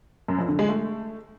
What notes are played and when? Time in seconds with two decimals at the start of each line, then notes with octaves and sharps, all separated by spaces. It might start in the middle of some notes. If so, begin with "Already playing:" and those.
0.28 F#2
0.39 F2
0.49 D3
0.59 G#3
0.69 A3